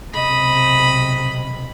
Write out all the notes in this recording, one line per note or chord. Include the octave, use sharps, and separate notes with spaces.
B1 C3 D#5 B5